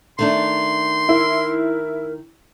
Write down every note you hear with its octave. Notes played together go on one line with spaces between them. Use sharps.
D#3 A3 D4 C6
E4 A#4